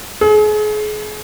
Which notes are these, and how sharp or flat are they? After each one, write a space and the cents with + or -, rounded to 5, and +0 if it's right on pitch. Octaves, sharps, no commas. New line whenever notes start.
G#4 +35